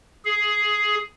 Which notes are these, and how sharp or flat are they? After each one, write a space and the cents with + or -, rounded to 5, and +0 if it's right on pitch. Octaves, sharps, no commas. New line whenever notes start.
G#4 +10